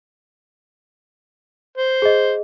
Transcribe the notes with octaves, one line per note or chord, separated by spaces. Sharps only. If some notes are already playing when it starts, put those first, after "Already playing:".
C5
G#4 D#5